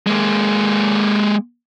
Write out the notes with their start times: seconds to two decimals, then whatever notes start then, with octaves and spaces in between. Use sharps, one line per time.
0.07 G#3 A#3